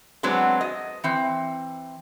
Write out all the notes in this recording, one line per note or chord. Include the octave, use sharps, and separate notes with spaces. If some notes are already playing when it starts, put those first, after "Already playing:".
F#3 G#3 B3 C4 D4
D#5
E3 C4